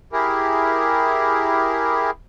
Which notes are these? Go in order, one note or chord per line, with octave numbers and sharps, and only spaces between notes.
E4 G4 G#4 A#4